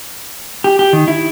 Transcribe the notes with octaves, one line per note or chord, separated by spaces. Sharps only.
G4
G4
D#3
E4